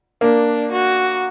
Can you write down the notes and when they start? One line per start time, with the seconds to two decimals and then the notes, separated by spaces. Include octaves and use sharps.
0.21 A#3 D4
0.72 F#4